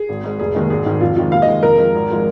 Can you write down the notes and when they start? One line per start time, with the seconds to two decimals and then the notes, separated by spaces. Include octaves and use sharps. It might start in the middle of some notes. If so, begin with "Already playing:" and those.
Already playing: G#4
0.09 G#1
0.24 G#2 G#3
0.40 F1 G#4
0.55 D#2 D#3 G#3
0.70 G#1 G#4
0.85 G#2 D#3 G#3
1.01 F2 F4
1.16 C3 D#3 G#3 F4
1.32 D#2 F5
1.42 D#5
1.48 D#3 G#3
1.63 F2 A#4
1.78 F3 G#3
1.94 G#1
2.11 F3 G#3